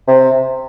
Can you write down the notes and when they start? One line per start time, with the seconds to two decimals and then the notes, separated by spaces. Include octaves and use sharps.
0.08 C3